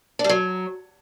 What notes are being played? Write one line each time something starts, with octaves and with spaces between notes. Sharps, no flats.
D4
G3
F#3